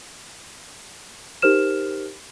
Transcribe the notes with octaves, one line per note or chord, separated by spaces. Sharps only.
D#4 G4 A#4 C5 F6 E7